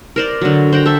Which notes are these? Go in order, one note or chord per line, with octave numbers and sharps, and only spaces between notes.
A#4 C5 D5
D3 F#3
C5 F#5 G5 A#5
A4 C5 E5